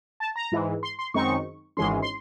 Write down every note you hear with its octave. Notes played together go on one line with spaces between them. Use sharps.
A5
A#5
G#2 E3 G#3
C6
C6
F#2 D#3 G#3 C4 D#4 C#6
G#1 G#2 E3 G#3 C#4 C6
C6